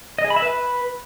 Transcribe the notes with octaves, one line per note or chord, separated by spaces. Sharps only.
D#5
G#4
B5
E5
B4